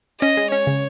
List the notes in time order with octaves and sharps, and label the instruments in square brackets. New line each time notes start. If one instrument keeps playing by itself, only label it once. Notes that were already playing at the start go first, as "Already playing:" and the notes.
[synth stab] C#4 [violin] D#5
[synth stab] G#3
[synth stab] C#4 [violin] C#5
[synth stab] C#3